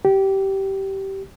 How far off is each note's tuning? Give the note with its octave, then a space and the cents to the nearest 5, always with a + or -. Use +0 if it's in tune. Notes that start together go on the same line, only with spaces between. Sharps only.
G4 -15